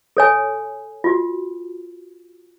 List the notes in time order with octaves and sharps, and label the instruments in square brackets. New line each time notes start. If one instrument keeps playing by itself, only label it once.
[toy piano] A4 C#5 G#5
F4 F#4